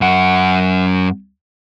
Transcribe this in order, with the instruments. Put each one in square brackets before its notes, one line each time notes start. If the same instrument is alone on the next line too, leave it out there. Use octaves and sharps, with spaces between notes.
[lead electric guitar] F#2 F#5